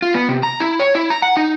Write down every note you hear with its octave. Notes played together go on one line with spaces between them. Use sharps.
F4
B3
C3
A#5
E4
C#5
E4
A#5
F#5
D#4